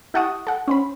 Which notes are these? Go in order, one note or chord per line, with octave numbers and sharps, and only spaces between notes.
E4 G4 F#5 A5 C#6 D#6
A4 F#5
C#4 C5 B5